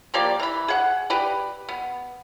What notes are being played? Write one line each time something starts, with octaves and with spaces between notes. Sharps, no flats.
F3 A#3 G4 D5
E3 B5
G#4 F#5
G4 B4 D5
B3